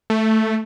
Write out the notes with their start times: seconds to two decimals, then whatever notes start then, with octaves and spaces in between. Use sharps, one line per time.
0.10 A3